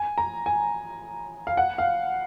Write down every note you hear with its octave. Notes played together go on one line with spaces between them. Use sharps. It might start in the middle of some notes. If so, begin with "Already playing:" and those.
Already playing: G#5
A#5
G#5
F5
F#5
F5